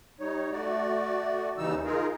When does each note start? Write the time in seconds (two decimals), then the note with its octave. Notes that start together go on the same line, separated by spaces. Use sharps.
0.20 G3 D#4 C#5
0.52 A3 F#4 D5
1.58 D#2 C#3 E3 G3 D#4 E6
1.84 D#4 F4 G#4 A#4